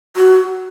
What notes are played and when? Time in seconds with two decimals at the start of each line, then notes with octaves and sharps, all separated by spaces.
0.16 F#4